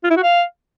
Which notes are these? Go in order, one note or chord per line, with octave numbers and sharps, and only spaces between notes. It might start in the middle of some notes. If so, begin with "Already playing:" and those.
F4
E4
F#4
F5